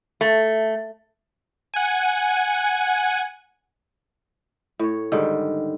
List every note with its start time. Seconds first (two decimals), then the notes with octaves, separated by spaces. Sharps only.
0.21 A3
1.74 F#5 G#5
4.79 A2 C#5
5.12 G#2 D3 D#3 G3